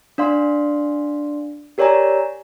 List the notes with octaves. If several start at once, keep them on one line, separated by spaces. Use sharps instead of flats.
D4 D5 F5 C6
G4 A#4 C#5 D5 G#5 A#5